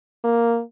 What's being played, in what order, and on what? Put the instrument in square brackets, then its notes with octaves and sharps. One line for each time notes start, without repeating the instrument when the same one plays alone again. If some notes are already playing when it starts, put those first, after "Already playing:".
[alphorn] A#3